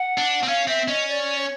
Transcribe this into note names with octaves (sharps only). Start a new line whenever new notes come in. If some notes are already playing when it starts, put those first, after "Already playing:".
Already playing: F#5
D4
C4
C#4 F5
C4 E5
C#4 D#5
D5
C#5